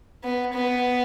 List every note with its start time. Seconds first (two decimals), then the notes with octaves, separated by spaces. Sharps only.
0.24 B3
0.53 B3